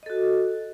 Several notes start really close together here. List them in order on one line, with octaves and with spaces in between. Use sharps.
D#5 A4 F#4